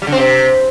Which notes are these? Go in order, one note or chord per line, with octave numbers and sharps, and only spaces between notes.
G3
D3
C4
C3